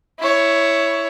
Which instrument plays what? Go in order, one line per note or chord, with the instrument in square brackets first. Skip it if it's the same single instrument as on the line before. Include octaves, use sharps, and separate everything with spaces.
[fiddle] E4 C#5